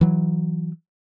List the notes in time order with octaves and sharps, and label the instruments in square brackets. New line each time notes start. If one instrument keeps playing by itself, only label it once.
[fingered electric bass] E3 F#3